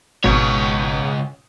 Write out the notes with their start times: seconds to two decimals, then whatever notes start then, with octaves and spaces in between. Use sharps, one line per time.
0.24 G#1 C#2 G#2 B2 C#5